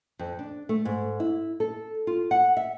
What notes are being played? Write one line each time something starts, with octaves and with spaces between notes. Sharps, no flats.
F2
D4
A3
G#2
E4
A4
F4
F#5
E5